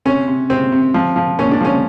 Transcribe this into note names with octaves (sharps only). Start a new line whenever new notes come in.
C3 C#4
C3
C3 C4
C3
F3
F3
A#2 C#4
D4
F3 C#4